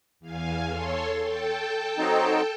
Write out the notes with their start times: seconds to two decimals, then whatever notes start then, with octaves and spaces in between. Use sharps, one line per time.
0.20 E2 F5 G#5
0.69 A4 C#5 C6
1.22 A4 G5 A5
1.98 F#3 C4 D#4